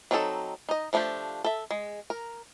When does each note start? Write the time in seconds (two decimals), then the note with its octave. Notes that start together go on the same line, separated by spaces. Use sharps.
0.11 F#3 C4 D4 D#4 A4
0.69 D#4 D#5
0.93 F3 A3 D4 F4 G4
1.44 A4 E5
1.71 G#3
2.10 A#4